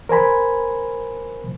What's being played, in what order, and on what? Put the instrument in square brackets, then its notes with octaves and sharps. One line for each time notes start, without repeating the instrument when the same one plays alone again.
[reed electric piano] A#4 C5 G#5 B5